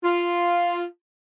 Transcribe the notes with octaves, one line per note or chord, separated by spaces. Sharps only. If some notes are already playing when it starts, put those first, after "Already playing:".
F4